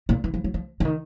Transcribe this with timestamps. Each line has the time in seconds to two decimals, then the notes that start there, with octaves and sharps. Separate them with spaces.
0.09 A#2
0.24 E3
0.34 F3
0.44 F#3
0.54 F3
0.80 D3
0.85 D#3